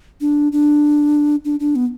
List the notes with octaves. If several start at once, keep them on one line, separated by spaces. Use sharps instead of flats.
D4
D4
D4
D4
B3